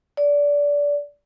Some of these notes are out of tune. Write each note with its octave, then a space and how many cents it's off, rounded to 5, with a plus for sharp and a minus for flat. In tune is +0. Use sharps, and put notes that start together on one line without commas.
D5 -20